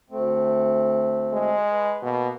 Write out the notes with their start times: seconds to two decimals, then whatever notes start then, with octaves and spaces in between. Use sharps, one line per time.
0.10 D2 A3 C4
1.33 G#3
1.71 B4
2.02 B2 A#3